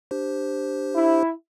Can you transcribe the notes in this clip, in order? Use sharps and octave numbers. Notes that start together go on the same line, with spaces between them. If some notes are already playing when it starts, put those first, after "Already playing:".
D4 G4 C5
E4